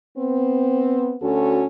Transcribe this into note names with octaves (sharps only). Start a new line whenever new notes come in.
B3 C4
D2 C#4 F#4 A4